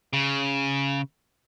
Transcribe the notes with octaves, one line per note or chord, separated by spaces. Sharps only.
C#3